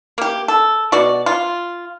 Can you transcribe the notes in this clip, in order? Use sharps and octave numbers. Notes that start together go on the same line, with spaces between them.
A#3 G4
A4
B2 F#4 D5
F4